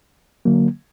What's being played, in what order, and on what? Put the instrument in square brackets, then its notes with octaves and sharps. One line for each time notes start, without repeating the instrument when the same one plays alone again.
[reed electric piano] D3 F#3 A#3